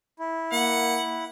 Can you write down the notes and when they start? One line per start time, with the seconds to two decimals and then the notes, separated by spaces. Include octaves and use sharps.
0.19 E4
0.52 A#3 F#5